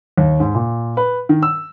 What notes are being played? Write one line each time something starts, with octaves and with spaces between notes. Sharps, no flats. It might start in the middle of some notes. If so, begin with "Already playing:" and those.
D#2
G#2
A#2
B4
D#3
E6